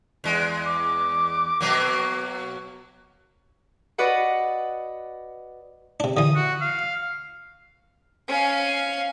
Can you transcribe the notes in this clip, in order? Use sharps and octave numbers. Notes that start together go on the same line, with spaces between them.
E2 G#3
D6
B2 F#3 A#3
F#4 B4 D5 D#5 F#5
C3 D4
D3 E3 D#6
F#4
F5
C#4 F5